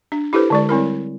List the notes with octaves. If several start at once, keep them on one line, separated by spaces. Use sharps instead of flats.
D4
E4 G4 A4 B4 C5
D3 G#3 D5
G3 C4 E4 A#4